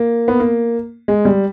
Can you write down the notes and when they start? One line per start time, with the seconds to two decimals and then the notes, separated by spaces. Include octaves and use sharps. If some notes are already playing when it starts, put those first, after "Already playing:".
Already playing: A#3
0.28 B3
0.40 A#3
1.08 G#3
1.25 G3